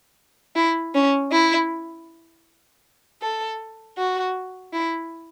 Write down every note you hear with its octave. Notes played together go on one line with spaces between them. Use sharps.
E4
C#4
E4
A4
F#4
E4